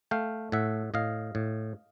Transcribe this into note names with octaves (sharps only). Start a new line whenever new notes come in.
A3 F5 G5
A2 E5 F#5
A2 D#5 F5
A2